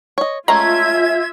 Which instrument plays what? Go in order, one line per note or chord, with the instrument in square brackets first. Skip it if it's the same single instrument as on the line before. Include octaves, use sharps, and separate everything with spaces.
[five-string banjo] C#5 D#5
[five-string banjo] G#3 A3 C#4 [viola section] F4 E5 [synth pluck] A#5 [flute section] G#6